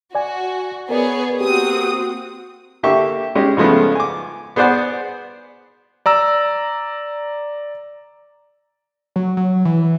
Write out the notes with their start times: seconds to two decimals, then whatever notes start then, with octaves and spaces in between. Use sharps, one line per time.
0.15 F#4 D5 G#5
0.90 B3 G#4 A#4 C#5 D5
1.41 A#3 C4 F#4 G4 D#6
2.83 D3 A#3 G4 E5 C#6
3.35 G#3 C#4 D#4 G4
3.57 C#3 F3 G#3 A3 B3
3.95 G#5 D6
4.56 B3 G#4 C5 D5 F#5 G#5
6.06 D5 A#5 E6
9.16 F#3
9.37 F#3
9.65 E3